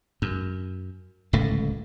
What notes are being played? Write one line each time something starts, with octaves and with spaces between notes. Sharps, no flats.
F#2
D1 C#2 A2 A3